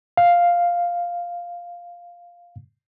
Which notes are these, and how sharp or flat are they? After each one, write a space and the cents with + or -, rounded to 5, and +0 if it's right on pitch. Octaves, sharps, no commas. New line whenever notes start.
F5 +0